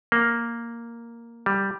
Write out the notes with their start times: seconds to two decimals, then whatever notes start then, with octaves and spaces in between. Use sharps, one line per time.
0.12 A#3
1.46 G3